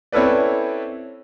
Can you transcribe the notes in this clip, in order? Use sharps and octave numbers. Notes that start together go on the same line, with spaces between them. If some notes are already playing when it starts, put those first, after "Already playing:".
C4 C#4 E4 A4 B4 D5